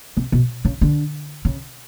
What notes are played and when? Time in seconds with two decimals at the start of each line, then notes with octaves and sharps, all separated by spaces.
0.17 C3
0.32 B2
0.65 C#3
0.81 D3
1.45 C#3